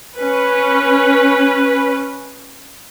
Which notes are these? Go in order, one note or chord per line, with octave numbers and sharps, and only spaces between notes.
C#4 B4